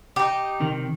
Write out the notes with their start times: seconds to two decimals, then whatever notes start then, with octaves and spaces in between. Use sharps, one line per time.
0.16 D#4 G4
0.60 C3 D#3